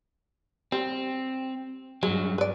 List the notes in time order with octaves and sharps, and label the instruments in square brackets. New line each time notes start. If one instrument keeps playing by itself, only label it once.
[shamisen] G3 [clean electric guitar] C4
[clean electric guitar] G2 F#3 [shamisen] G#3
[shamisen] B4 D5